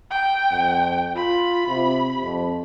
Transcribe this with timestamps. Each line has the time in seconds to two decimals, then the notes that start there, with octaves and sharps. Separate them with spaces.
0.11 G5
0.52 F2
1.16 F4 B5
1.68 C3
2.23 F2